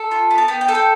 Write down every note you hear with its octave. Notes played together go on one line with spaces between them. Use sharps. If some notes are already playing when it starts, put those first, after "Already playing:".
Already playing: A4 A5
F4
B3
A5
B3 G5
G5
A4
G5